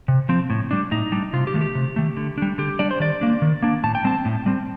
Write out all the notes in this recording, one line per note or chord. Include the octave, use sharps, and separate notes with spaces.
C3
F3 C4
A2
G3 D4
A2 D#4
G3 D4
C3 F4
G4
D#3 A3
G4
C3
D#3 A3
D3
G3 D4
D3 G4
G3 D4 D5
C5
D#3 D5
A#3 D4
D#3
A#3 D4
A2 A5
G5
G3 C4 A5
A2
G3 C4